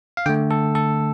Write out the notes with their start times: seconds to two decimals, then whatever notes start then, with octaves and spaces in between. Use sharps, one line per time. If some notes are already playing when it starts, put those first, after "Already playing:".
0.17 F5
0.26 D3 A3 G5
0.51 A4
0.75 A4